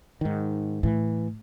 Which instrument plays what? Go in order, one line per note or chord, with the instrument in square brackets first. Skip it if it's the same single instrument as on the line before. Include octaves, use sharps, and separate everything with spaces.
[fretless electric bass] G#2 D#3
[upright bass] A2 [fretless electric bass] E3